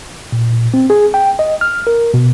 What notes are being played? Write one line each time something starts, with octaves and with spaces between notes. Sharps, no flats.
A#2
A#2
C4
G#4
G5
D#5
F6
A#4
B2